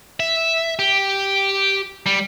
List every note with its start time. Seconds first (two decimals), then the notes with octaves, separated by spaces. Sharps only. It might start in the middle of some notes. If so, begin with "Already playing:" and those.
0.20 E5
0.79 G4
2.06 G3